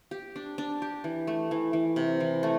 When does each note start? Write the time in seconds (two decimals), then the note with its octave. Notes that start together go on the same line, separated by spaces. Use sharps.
0.11 G4
0.36 D4
0.58 D4
0.82 G4
1.04 E3
1.27 A3
1.51 E3
1.73 E3
1.96 C3
2.20 E3
2.43 A3